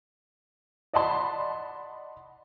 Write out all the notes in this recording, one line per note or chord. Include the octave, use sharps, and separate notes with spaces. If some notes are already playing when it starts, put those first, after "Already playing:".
D5 D#5 F#5 A5 B5 C6